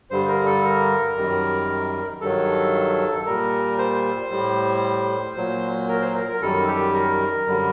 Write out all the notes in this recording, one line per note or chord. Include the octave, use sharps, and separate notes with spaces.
G2 D3 G3 C5
A#4
A4
A#4
F#2 D#3 G3
G2 D#3 F#3 A4
A#2 G3 A#4
C5
A2 G3
A#2 F#3
A#4
C5
A#4
A#4
F#2 D#3 G3 A4
G4
A#4
F#2 D3 G3